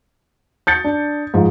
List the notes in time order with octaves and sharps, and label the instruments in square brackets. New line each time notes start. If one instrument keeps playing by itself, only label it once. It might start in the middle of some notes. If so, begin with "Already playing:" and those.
[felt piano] G6 A6 C#7
D4
G#2 F3